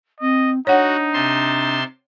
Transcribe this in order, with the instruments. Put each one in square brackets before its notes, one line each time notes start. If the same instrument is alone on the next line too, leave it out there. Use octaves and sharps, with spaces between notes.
[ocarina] C4 [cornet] D#5
[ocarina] D4 [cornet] D#4 [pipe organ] F#4 [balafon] C#5 F#5
[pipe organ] C3 A5 C6